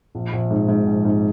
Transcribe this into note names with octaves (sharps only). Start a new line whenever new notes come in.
A#1
A#1
G#2
G#2
A#1
G#2